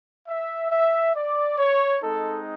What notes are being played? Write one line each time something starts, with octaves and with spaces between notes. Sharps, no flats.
E5
E5
D5
C#5
G#3 C4 D#4 A4